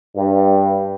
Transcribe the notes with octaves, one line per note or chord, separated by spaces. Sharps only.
G2